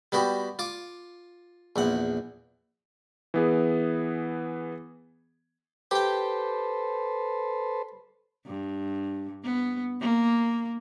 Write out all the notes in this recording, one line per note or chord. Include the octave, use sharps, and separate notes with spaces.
G3 B3 F#4 G4
F4 D6
A#1 E2 F#5
E3 B3 G#4
G4 A4 B4 C5 G5
G2
B3
A#3